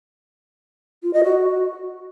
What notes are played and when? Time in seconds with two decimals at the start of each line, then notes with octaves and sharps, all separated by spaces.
1.03 F4
1.13 D#5
1.24 F#4